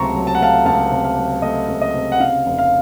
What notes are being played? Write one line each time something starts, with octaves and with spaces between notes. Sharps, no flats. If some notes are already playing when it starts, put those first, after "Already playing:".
Already playing: C#2 C3 F#3 A3 A5 A#5 C6 C#6
F#3
A5
F#5
A3 F5 A5
C#2 F5 A5
C3
F5
F#3
A3 D#5
C#2
D#5
C3
F#5
C#3 F5
F1
F5